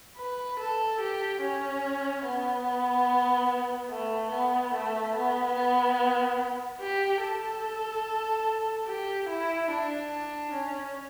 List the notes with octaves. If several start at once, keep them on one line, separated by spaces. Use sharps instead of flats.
B4
A4
G4
C#4
B3
A3
B3
A3
B3
B3
G4
A4
G4
E4
D4
C#4